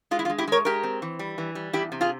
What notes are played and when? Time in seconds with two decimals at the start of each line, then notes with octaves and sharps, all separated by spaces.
0.11 G#3 F4
0.19 E4
0.25 F4
0.30 G#3
0.38 E4 G4
0.47 G#3 A#4 C#5
0.65 G#3 G4 A#4
0.83 C4
1.02 E3
1.19 G3
1.38 E3
1.55 G3
1.73 E2 E4 G4
1.92 C3
2.01 F4 G#4